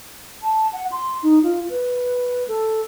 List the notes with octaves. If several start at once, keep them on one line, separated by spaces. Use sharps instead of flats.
A5
F#5
C6
D#4
F4
B4
A4